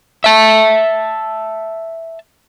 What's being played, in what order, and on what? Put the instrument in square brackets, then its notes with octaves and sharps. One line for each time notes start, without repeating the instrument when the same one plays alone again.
[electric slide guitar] E5 A5